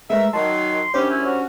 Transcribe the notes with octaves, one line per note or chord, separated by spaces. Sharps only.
G#3 A3 A#4 B4 E5
D#3 F#3 A5 C6
F#2 G3 C#4 D4 G4 C5 C#5
E4
F#4